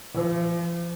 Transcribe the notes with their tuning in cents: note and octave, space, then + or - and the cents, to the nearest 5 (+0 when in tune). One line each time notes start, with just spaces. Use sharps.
F3 -35